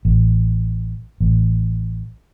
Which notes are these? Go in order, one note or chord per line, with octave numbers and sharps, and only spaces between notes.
A1
A1